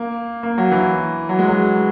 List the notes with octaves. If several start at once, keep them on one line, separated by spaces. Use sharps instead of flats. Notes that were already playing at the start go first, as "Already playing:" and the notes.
Already playing: A#3
A#3
F#3
E3
F#3
G#3
F#3